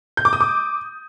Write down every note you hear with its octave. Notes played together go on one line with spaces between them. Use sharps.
G6
D6
D#6
D6